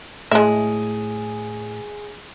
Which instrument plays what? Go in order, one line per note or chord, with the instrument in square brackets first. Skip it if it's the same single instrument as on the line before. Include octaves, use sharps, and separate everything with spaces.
[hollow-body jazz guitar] A2 [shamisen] G#3 E5 [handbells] G#4 G#5